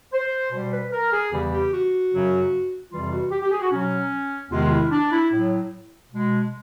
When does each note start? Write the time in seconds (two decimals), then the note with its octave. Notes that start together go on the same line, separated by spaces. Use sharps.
0.13 C5
0.52 B2 G3 C5
0.72 B4
0.92 A#4
1.12 G#4
1.32 E2 C#3 E3 G3 G4
1.52 G4
1.72 F#4
2.12 F#2 C#3 F#3
2.91 F2 C3 E3 G3 F4
3.11 F#4
3.31 G4
3.41 G4
3.51 G#4
3.61 F#4
3.71 B2 F#3 C#4
4.51 E2 C3 D#3 G#3 F4
4.71 E4
4.91 D4
5.11 E4
5.31 A2 F#3
6.11 B2 G#3